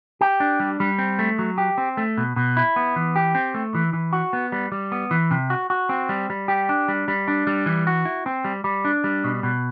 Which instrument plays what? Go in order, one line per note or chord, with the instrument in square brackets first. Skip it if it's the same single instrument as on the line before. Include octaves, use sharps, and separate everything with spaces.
[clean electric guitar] G4
D4
G3
G3
C4
A3
F#3
G4
C4
A3
B2
B2
E4
B3
E3
G4
C4
A3
E3
E3
F#4
B3
G3
G3
B3
E3
C3
F#4
F#4
C4
G3
G3
G4
D4
G3
G3
D4
G3
E3
F#4
E4
C4
G3
G3
D4
G3
B2
B2